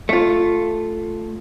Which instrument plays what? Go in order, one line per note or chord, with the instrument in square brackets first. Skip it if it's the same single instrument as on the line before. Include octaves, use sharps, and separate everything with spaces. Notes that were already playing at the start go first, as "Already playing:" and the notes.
[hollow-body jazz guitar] A3 F4